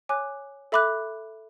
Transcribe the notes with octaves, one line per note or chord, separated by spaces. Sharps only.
C#5 G#5 D6 F#6
A4 E5 B5 D6 F#6